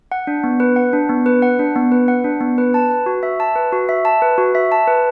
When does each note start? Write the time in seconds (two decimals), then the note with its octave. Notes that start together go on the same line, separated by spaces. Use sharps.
0.12 F#5
0.27 D4
0.44 B3
0.60 B4
0.76 F#5
0.93 D4
1.09 B3
1.26 B4
1.42 F#5
1.59 D4
1.76 B3
1.92 B4
2.08 F#5
2.24 D4
2.41 B3
2.58 B4
2.74 A5
2.90 B4
3.06 F#4
3.23 E5
3.40 A5
3.56 B4
3.73 F#4
3.89 E5
4.05 A5
4.22 B4
4.38 F#4
4.55 E5
4.72 A5
4.87 B4